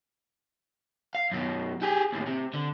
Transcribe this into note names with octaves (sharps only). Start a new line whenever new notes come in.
F5
F#2 B2
G4 G#4
D#2 A2
C3
D3